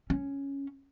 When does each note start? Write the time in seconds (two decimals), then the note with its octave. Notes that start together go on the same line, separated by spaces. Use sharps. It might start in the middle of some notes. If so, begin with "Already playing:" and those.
0.10 C#4